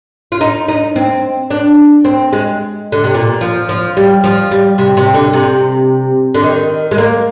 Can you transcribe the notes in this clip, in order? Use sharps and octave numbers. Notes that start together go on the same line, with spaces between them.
F4
D#4
D#4
C4
D4
C4
G#3
D3
C3
A#2
F3
F3
G3
F3
G3
C3
C3
D3
C3
D3
D#3
G#3
A#3